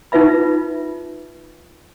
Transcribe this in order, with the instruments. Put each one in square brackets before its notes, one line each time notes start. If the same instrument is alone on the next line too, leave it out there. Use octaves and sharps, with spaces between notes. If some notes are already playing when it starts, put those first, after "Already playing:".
[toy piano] D#4 F4 B4 E5 B5